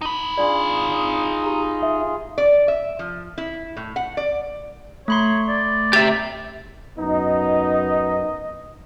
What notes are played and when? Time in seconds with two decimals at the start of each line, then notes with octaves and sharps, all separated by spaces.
0.01 D#4 B5
0.38 D4 F4 G#4 D5
1.43 G4 A#5
1.82 E5
2.38 D5
2.68 E5
2.99 F3
3.38 E4
3.77 A2
3.96 F#5
4.17 D5
5.08 A3 C#5 B5 C6
5.48 D5
5.93 G4 E5 A6
6.98 F#2 B3 D#4 D#5